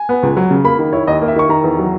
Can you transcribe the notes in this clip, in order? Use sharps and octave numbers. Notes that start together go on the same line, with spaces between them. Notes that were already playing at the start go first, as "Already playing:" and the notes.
Already playing: G#5
B3
C#2
F#3
C#3
A#3 B5
D#3
E4 C#5
D#2 D#5
A#3
E5
D#3 C#6
D#3 A#5
E2
F#3